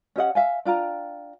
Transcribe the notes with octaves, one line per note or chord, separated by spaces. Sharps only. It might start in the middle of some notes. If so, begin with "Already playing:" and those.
C#4 G4 D#5 F#5
E5 F5 G#5
D4 F4 G5 A#5